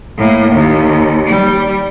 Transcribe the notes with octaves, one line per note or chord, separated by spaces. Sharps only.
A2 A#3
D#2
G3